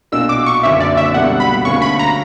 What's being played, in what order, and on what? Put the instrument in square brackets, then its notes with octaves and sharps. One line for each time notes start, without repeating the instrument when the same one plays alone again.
[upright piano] B1 A#2 A#3 D4 F#4 [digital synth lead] E6
[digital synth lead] D6
C#6
[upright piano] F#1 F#2 D3 A#3 C#4 [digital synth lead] E5
[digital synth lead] D5
E5
[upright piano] C#2 B2 G3 A#3 D4 [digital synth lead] F#5
[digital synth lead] B5
[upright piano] D2 D3 A#3 C#4 [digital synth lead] C#6
[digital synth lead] B5
A#5